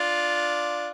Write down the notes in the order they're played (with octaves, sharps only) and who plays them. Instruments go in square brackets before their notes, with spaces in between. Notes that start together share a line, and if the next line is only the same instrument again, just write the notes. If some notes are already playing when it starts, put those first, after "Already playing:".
Already playing: [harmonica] D4 F4